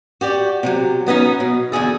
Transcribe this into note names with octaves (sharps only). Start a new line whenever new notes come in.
F#4 G4 D5
C3 F3 F#3
F#3 B3 C#4 D#4
B2
E2 D3 G#4 A4